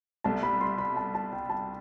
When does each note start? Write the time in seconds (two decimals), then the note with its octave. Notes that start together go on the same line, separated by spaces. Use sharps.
0.24 C2 B2 A3 A5
0.43 B5
0.61 C6
0.78 B5
0.97 A5
1.15 A5
1.32 G5
1.49 A5